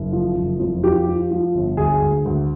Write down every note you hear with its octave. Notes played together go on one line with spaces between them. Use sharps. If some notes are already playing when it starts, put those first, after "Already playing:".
Already playing: F#1
F3
F#1
F2
F3 G4
F3
F3
G1
D2 G#4
D2
D2